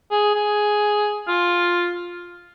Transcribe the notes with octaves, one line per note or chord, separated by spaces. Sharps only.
G#4
G#4
F4